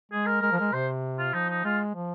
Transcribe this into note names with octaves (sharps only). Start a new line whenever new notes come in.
G#3 G#4
A#4
G#3 A#4
F3
G#3 A#4
C3 C5
F4
F3 D#4
D#4
G#3 F4
F3